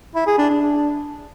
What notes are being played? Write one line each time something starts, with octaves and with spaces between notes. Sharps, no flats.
E4
G#4
D4
D4